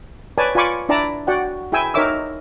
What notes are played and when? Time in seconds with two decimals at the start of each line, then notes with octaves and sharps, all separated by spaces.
0.38 B4 C#5 D5 G#5 A5
0.55 F4 D5 G#5 B5 C#6 D6
0.89 D4 E4 D5 A5 A#5
1.27 F#4 D5 F#5 G5
1.72 E4 G#4 G5 G#5 E6
1.94 D#4 A#4 C#5 E5 D6 E6